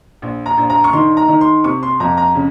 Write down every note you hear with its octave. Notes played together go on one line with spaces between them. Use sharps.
A#1
A#5
A#1
A#5
C#6
D#3 C6
A#5
D#3
C6
C3 C#6
C6
F2 A#5
A#5
C#3